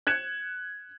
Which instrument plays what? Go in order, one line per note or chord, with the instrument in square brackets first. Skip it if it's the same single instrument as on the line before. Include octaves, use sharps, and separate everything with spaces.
[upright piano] F#6 G#6 C#7 E7